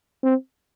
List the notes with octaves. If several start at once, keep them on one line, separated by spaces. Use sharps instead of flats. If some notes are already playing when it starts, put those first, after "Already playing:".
C4